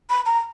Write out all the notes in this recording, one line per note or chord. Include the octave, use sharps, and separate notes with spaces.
B5
A#5